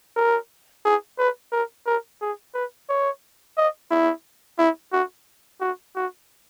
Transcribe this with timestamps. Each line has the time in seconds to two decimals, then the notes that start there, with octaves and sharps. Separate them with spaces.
0.16 A#4
0.85 G#4
1.18 B4
1.52 A#4
1.86 A#4
2.21 G#4
2.54 B4
2.89 C#5
3.57 D#5
3.91 E4
4.58 E4
4.92 F#4
5.61 F#4
5.96 F#4